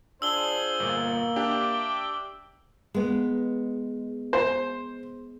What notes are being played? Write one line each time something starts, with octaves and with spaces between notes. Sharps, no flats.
D4 F4 G#4 C5 E6 G7
G1 A#2 A#3
D4 G4 E5 G5 D6
G#3 B3
C5